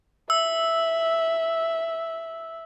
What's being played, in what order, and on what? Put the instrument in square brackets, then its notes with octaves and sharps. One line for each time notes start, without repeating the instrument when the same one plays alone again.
[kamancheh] E5 [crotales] E6